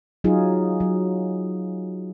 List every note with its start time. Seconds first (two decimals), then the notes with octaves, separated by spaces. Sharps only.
0.24 F#3 D#4 F4 G#4
0.80 F#3